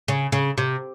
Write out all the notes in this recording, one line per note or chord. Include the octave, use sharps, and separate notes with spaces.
C#3
C#3
C3